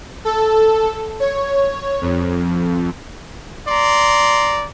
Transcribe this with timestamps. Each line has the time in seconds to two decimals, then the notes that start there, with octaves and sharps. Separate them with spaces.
0.25 A4
1.20 C#5
2.01 F2
3.67 D5 A#5 C6